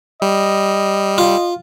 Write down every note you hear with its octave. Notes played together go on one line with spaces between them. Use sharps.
G3 D#5
F4